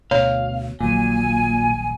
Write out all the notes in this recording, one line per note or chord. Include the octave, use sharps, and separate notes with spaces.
D2 B2 C#5 F5
D#1 A#1 A#2 F#3 G#5